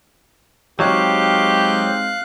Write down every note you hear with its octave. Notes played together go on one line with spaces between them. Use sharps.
F#3 G#3 C4 D#4 G4 F5 F#6